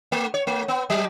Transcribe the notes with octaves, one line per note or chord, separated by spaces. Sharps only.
A3
C#5
A3
B3
F#3